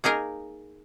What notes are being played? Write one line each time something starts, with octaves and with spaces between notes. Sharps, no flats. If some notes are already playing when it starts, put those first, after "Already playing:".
A#3 D#4 G#4 A#4